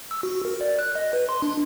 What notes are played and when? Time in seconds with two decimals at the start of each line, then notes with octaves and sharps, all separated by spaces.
0.11 E6
0.23 F#4
0.45 A#4
0.61 D5
0.79 F#6
0.95 D#5
1.13 B4
1.29 C6
1.42 D4